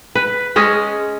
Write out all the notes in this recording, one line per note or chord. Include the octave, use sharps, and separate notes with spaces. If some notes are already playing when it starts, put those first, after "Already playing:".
B4
G#3 C#4 D#5